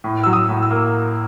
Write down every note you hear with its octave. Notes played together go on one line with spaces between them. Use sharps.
A2
F#3 E6
D#6
A2
E6
A#3